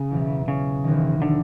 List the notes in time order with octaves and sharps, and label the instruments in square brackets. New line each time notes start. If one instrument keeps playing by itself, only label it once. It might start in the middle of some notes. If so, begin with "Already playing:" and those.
Already playing: [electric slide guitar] C#3 [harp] C#4
[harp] E2 B2 F#3
[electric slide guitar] C#3
[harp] E1 D#2 D#3
[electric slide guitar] D3